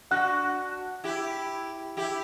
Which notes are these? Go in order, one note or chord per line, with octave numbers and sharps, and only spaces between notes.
D4 F#4 F#5 F#6
E4 G4
E4 G4